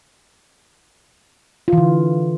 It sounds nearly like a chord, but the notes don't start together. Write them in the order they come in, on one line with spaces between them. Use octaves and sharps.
F4 E3 D3